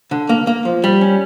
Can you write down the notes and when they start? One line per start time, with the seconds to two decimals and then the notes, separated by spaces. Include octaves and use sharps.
0.11 D3
0.29 A#3
0.47 A#3
0.65 F3
0.84 G3
1.01 C#4